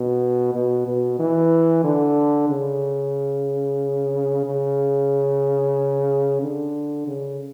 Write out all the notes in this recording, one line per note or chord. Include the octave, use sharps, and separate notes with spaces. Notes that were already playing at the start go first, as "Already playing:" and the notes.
Already playing: B2
B2
B2
E3
D3
C#3
C#3
D3
C#3